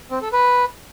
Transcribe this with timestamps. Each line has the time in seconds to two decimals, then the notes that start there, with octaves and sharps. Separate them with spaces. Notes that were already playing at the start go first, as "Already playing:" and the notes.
0.10 C4
0.22 A4
0.33 B4